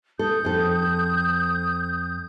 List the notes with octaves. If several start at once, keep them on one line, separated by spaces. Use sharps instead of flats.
A4 D#6 G6
F2 A4